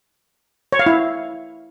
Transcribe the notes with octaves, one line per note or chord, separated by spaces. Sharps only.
C#5
F5
E4